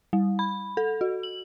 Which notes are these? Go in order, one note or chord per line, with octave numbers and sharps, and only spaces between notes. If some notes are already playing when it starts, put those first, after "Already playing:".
G3
B5
A4
F#4
F#7